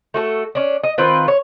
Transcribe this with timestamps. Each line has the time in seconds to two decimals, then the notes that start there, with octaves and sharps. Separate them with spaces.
0.14 A3 F#4 A4
0.55 C#4 D4
0.83 D#5
0.98 D#3 C4 F4 B4
1.28 C#5